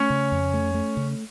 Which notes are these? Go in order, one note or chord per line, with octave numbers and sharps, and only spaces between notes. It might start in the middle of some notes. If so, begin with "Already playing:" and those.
Already playing: A3 C#4 C#5
C#3
F2
A3
A3
C#3